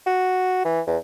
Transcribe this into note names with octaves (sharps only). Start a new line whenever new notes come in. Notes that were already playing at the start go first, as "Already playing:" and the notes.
F#4
E3
E2